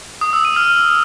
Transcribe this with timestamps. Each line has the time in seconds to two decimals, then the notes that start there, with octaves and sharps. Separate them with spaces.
0.21 D#6
0.33 E6
0.45 D#7
0.56 F6